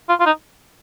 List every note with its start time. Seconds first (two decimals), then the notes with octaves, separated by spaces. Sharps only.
0.09 F4
0.20 F4
0.26 D#4